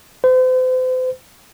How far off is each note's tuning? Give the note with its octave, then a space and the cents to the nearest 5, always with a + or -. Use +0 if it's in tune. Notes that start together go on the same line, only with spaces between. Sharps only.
C5 -40